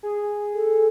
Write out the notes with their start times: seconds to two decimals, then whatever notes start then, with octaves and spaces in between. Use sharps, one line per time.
0.03 G#4
0.54 A4